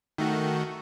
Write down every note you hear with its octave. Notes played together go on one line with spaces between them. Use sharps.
D#3 A3 F#4